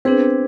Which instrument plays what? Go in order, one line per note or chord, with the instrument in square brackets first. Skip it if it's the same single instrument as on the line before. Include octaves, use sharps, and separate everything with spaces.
[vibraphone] B3 D4 G#4 B4 [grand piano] C4